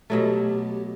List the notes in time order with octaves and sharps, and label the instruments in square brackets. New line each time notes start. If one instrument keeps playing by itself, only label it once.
[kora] B2 F#3 A3 [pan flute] G4